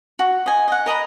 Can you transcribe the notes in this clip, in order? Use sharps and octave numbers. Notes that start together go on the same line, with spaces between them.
F#4
D#5 G#5
D#5 F#5
A#4 D#5 A#5 B5